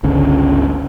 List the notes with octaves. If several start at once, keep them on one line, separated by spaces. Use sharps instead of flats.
G1 C#2 D3 C#4